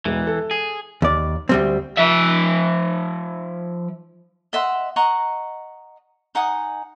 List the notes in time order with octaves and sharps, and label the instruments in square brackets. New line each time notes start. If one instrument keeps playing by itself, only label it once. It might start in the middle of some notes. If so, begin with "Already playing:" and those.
[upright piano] E1 G#3 [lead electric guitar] E3
[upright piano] A4
[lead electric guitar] G#4
[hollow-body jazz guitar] D#2 D5
D2 G3 C4
[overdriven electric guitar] F3 E5
[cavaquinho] D#5 E5 F#5 C6
D#5 F#5 A#5 C#6
D#4 F#5 G#5 D#6